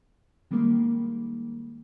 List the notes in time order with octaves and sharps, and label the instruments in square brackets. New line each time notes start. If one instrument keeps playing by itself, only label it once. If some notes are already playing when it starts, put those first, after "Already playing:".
[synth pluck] D#3 G3 G#3 A#3